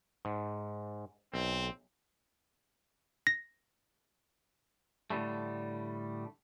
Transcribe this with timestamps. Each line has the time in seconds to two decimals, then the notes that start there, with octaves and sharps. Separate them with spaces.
0.25 G#2
1.34 B1 C4
3.27 A#6
5.10 A2 D3 D#3 G3 A3